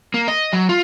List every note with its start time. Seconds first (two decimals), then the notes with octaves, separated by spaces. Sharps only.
0.14 A#3
0.28 D#5
0.53 F#3
0.69 F4